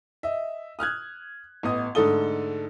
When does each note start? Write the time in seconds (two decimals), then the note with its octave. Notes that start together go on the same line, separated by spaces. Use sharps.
0.23 D#5 E5
0.79 D#6 F6 F#6 G#6
1.63 A1 B3 D#5 D#6
1.95 G#2 D3 A3 A4 D#6 G7